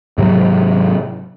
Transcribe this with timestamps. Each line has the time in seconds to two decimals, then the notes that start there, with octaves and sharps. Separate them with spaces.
0.18 G#2 C3 F#3